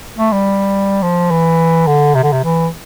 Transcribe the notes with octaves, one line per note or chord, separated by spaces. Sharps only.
A3
G3
F3
E3
D3
C3
D3
C3
E3